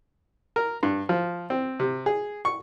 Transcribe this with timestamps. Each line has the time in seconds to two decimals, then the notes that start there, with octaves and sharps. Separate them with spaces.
0.56 A#4
0.83 G2
1.09 F3
1.50 C4
1.80 C3
2.06 G#4
2.45 C#6